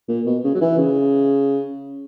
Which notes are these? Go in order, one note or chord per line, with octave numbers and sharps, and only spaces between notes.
A#2
B2
C#3
F#3
E3
C#3